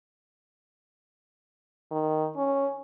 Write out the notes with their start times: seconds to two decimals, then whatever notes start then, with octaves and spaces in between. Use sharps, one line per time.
1.92 D#3
2.36 C#4